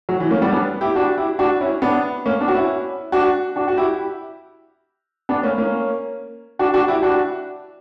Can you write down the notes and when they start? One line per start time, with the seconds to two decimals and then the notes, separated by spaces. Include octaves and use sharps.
0.09 F#3
0.20 E3
0.31 A#3 C#4
0.42 G3 B3
0.52 B3 D4
0.81 E4 G4
0.95 D4 F#4
1.18 E4 G4
1.39 D4 F#4
1.61 C#4 E4
1.82 B3 D4
2.26 A#3 C#4
2.41 B3 D4
2.48 F#4
2.55 C#4 E4
3.12 D4 F#4
3.56 D4 F#4
3.68 F#4
3.77 E4 G4
5.29 B3 D4
5.43 A#3 C#4
5.58 A#3 C#4
6.59 D4 F#4
6.74 D4 F#4
6.88 E4 G4
7.02 D4 F#4